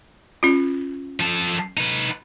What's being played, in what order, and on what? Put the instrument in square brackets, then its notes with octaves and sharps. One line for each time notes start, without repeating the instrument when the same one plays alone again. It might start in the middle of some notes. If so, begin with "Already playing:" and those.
[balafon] C#4 F4
[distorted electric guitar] F3 A4
D#4 B4